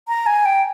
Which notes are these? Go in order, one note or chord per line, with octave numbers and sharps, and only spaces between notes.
A#5
G#5
G5